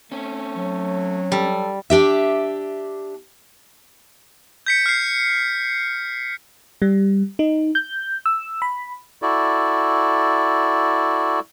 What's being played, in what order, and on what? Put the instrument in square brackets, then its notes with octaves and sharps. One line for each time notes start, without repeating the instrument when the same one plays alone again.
[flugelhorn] A3 [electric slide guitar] C4 C#4
[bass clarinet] F#3
[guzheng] G3 [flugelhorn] A4
[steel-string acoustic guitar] D4 G4 E5
[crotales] G6 B6 C#7
F6 C7
[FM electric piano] G3
D#4
G6
E6
B5
[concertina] E4 F#4 A4 D5